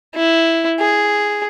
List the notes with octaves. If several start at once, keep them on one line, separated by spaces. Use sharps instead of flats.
E4
G#4